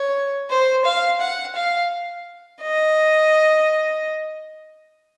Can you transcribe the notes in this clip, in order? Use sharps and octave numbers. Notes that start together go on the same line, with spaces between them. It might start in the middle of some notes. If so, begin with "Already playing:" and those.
Already playing: C#5
C5
F5
F#5
F5
D#5